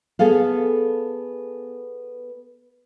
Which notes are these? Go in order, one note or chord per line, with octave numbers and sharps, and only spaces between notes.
B3 G#4 A4 F5